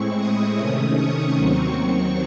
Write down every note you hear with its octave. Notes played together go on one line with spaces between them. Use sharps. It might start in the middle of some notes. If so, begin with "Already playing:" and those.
Already playing: A2 G#3 C4 E4 C#6
D#6
C3 D#3 A3 C#4
C#6
D#2 D#3 F#3 C4
C#6